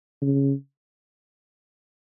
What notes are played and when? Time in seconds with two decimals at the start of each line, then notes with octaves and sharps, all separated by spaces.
0.22 C#3